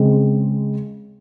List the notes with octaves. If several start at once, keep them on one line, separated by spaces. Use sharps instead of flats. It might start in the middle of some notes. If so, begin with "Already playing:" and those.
Already playing: C#3 G#3 C4